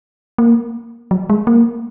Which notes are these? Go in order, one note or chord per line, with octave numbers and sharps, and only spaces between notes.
A#3
F#3
G#3
A#3